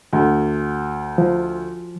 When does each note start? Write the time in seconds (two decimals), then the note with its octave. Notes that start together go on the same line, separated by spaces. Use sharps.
0.13 D2
1.18 F3